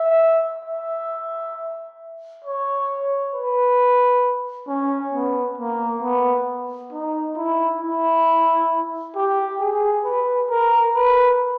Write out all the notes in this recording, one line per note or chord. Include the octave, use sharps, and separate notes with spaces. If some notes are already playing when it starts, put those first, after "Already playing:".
Already playing: E5
E5
C#5
B4
C#4
B3
A#3
B3
D#4
E4
E4
G4
G#4
B4
A#4
B4